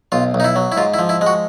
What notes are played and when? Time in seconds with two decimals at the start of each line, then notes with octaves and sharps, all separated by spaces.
0.12 B1 F4
0.34 B1
0.40 D#4
0.44 E4
0.56 F#3
0.72 E4
0.77 G#2 F4
0.94 E4
0.99 F3
1.09 E4
1.21 G#3
1.27 F#4